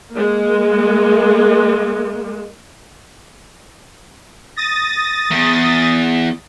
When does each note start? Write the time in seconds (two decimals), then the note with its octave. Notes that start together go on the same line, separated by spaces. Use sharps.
0.13 G#3 A#3
4.56 D#6 A6 A#6
5.31 E2